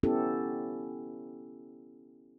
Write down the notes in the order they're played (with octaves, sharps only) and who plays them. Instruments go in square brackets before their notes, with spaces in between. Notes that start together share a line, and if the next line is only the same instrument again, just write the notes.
[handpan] B3 C#4 E4 G4 A4